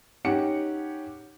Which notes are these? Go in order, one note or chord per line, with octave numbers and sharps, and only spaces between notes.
C#4 D#4 G4 F#5 C#7